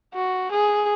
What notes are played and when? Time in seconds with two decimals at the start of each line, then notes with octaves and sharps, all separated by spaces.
0.14 F#4
0.51 G#4